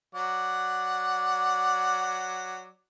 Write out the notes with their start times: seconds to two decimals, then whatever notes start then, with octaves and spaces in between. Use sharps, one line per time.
0.15 F#3 D5 F#5